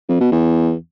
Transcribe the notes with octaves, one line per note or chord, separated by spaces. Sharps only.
F2
B2
E2